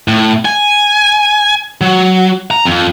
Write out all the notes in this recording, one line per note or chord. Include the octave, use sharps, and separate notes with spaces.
A2
G#5
F#3
A#5
F2